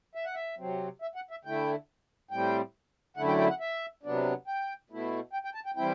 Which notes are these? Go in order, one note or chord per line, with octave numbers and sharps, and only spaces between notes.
E5
F#5
E5
C3 F#3 C4
E5
F#5
E5
D3 A3 E4 G5
A2 G3 C4 G5
F#2 D3 A3 E4 F#5
G5
G5
F#5
E5
C3 F#3 B3 D4
G5
B2 A3 E4
G5
G5
A5
G5
E3 G3 C4 E4 G5